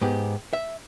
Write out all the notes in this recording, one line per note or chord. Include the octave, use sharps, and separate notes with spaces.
G#2 B3 G4
E5